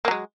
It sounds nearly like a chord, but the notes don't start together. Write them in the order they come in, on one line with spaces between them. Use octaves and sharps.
A#3 F#3 G#3